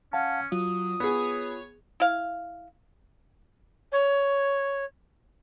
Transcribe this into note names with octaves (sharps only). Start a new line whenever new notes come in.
C#4 F5 F#5 A5
F#3 F4 D#6
B3 G#4 C#5
E4 F5
C#5